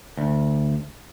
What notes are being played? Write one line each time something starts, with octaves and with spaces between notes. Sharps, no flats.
D2